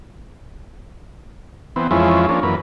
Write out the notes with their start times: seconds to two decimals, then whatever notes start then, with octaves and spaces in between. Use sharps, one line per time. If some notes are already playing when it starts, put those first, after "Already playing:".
1.76 E3 B3 C4
1.91 F2 E3 F3 G#3 C#4 E4
2.29 F3 A#3 C#4 D4
2.43 F#2 E3 A#3 B4